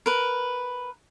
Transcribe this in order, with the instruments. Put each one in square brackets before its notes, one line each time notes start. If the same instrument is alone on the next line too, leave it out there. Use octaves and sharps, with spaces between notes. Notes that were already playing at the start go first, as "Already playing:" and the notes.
[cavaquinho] A#4 B4